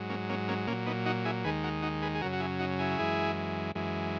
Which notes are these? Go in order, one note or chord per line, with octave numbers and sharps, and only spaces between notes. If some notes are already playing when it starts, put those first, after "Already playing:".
Already playing: G#2 F#3
A#3 C#4
A#3 C#4
A#3 C#4
A#2 A#3 C#4
F#3
B3 D#4
D#4 F#4
E4 G#4
D#2 D#3 G#3 G#4 B4
F#4 A#4
D#4 F#4
G#4 B4
G#4
F#2 C#3 F#3 F#4 A#4
F#4
E4 G#4
D#4 F#4
E4 G#4
F#2 E3 G#3
F#2 E3 G#3